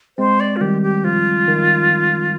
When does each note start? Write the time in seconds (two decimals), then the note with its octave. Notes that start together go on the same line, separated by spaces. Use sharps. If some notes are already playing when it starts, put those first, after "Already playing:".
0.18 G#3 C4 C5
0.40 D5
0.56 F4
0.61 D#3 G3 G4
0.82 G4
1.04 F3 F4
1.48 D#3